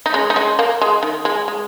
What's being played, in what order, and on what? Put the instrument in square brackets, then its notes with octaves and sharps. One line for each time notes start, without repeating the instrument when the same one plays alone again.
[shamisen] D#4
G#3 C#4
D#4
G#3 C#4
A#3
G#3
D#3
G#3
G#3